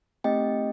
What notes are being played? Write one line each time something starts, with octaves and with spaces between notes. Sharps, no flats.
A3 C4 D#4 G4 D#5 G5